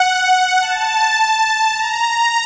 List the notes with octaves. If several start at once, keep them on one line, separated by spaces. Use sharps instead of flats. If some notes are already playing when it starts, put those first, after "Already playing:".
Already playing: F#5
A5
A#5
A#5